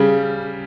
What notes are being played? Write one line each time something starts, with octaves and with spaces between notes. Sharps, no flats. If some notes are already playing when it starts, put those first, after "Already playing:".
Already playing: C#3 G3